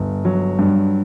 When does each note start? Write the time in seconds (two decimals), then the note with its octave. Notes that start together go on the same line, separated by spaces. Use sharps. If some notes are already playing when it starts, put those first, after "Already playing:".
Already playing: G1
0.25 F#3
0.59 G2